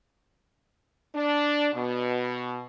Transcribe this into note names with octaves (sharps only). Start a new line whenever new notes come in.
D4
B2